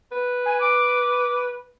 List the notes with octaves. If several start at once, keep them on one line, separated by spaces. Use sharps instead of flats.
B4
G#5
D6